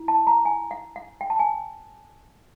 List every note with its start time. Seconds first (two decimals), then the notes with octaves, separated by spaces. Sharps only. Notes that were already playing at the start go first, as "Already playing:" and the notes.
Already playing: E4
0.08 A5
0.27 A#5
0.45 G#5
0.71 F#5
0.96 F#5
1.21 G5
1.30 A5
1.39 G#5